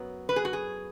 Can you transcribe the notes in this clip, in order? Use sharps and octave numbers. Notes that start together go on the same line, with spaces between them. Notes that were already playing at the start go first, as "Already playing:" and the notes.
Already playing: F#2 F#3 B3
B4
G#4
F#4
G#4